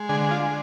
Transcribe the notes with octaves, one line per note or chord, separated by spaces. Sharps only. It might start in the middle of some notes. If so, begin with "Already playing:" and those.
Already playing: G#3
D3 G#4
F4
G#3